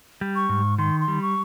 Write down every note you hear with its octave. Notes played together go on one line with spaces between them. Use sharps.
G3
C#6
G#2
D#3 C6
C6
G3
C#6